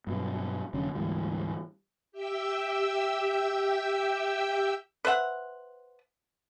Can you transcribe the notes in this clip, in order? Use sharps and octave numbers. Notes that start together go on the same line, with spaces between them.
G2 B2 F#3
F1 D3 F#3 C#4
D2 G#2 E3 G3
G4 E5 G5 E6
B4 C5 E5 F#5